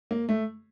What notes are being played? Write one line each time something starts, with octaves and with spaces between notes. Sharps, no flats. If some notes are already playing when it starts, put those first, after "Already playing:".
A#3
A3